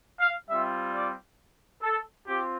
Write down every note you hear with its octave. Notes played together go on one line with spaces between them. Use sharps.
F5
G3 C4 F4 E5
D5
A4
C4 F4 G4